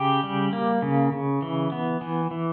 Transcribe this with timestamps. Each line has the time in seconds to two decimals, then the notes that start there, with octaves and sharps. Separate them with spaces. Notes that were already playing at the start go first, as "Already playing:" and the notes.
Already playing: C#3 G4
0.24 G3
0.53 A#3
0.82 C#3
1.13 C#3
1.42 E3
1.72 B3
2.01 E3
2.31 E3